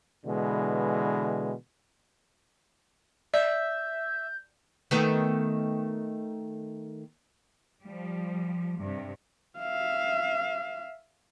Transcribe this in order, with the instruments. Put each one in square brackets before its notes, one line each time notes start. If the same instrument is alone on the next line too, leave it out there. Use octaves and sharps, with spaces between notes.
[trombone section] B2 D3 E3 G#3
[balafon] D5 [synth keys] E5 [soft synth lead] G6
[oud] D#3 A3 B3
[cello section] F3 G3
G2 C3
[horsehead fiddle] E5 F5